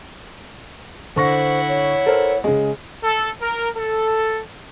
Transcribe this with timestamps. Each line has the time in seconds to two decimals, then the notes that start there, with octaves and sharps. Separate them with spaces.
1.16 D3 E4 C5 F#5 C#6 A#6
1.68 C#5
2.06 A4 A#4 C5
2.44 C#3 G#3
3.04 A4
3.41 A#4
3.77 A4